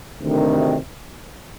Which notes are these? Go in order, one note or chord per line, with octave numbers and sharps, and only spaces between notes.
D2 C3 D#3